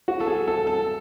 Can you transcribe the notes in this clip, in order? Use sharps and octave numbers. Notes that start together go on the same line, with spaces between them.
F#4
A4
G#4
A4
A4